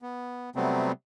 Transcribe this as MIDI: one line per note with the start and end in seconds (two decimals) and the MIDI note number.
0.02 0.50 59
0.56 0.92 48
0.56 0.92 54
0.56 0.92 55
0.56 0.92 57
0.56 0.92 59
0.56 0.92 60